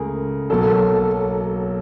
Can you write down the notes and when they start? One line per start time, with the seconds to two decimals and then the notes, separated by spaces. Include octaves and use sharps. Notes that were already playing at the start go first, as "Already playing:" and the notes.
Already playing: C#2 A3 G#4 A#4
0.50 B1 B2 F#3 A#3 A4